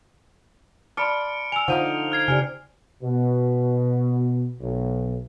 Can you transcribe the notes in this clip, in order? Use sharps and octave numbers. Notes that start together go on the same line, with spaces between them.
D5 A5 B5 C6 F6 C#7 D7
G#5 E6 F7
D3 F3 D#4 F5 F#5 D#7
F6 G#6 C7
C#3 G4 D5 G#5 F6
B2
B1